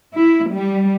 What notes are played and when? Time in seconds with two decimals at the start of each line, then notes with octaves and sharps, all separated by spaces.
0.13 E4
0.51 G3